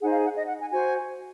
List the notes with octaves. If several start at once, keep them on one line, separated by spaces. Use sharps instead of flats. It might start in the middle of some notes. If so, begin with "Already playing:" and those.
D#4 G#4 C5 F#5
F5
F#5
D#5
F#5
G#5
F#4 C5 G#5